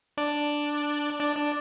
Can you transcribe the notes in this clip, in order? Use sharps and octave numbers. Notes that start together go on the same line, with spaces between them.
D4 D5
D4 D5
D4 D5